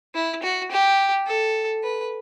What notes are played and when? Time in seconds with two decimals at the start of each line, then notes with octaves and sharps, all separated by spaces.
0.15 E4
0.43 F#4
0.71 G4
1.27 A4
1.84 B4